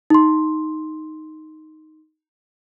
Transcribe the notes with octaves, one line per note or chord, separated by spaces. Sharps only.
D#4 C6